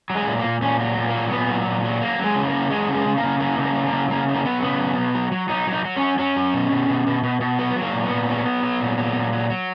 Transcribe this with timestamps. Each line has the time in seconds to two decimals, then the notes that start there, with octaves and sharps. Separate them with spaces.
0.10 F#3
0.15 G#3
0.27 A#2
0.39 A#3
0.45 A#2
0.62 A#2 C#4
0.80 F#3
0.97 A#2
1.09 A#3
1.15 F#3
1.31 A#2 B3
1.50 F#3
1.66 A#2
1.84 F#3
2.01 F#3 A#3
2.19 F#3
2.24 G#3
2.36 C#3
2.48 A#3
2.53 F#3
2.70 F#3 G#3
2.88 C#3
2.95 G#3
3.06 C#3
3.18 A#3
3.23 C#3
3.40 F#3 A#3
3.58 C#3
3.64 A#3
3.75 F#3
3.87 A#3
3.93 C#3
4.11 C#3 A#3
4.28 F#3
4.34 A#3
4.45 F#3 B3
4.62 C#3 B3
4.80 F#3
4.98 B2
5.14 F#3
5.32 F#3
5.49 F#3 D#4
5.67 F#3
5.73 D#4
5.85 F#3
5.97 C#4
6.02 F#3
6.19 F#3 C#4
6.36 F#3
6.54 B2
6.71 B2
6.89 B2
7.07 B2
7.23 B2
7.40 B2
7.59 F#3 B3
7.76 F#3
7.82 A#3
7.93 A#2
8.05 B3
8.11 A#2
8.28 F#3
8.46 F#3
8.63 F#3
8.80 A#2
8.98 F#3
9.15 A#2
9.33 F#3
9.50 F#3